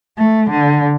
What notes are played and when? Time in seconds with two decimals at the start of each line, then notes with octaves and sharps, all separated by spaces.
0.19 A3
0.50 D3